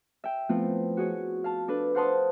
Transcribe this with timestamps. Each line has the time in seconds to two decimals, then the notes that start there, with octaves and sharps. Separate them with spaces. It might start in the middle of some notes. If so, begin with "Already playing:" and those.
0.24 E5 G5
0.49 F3 A3 B3 C4 E4 F4
0.97 F#4 G#4 C#5
1.44 F5 A5
1.68 D4 A4 B4
1.95 C5 F5 F#5 A5 C6 D#6